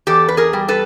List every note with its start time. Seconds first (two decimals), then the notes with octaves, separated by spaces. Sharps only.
0.07 E2 G4 A4
0.28 B4
0.37 G#4 A#4
0.53 G3
0.68 A4 B4